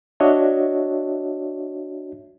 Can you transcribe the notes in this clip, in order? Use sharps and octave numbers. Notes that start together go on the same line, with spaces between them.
D4 F#4 C#5 D#5 E5